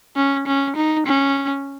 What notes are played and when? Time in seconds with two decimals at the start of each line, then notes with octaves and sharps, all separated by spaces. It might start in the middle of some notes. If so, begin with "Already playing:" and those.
0.16 C#4
0.47 C#4
0.76 D#4
1.06 C#4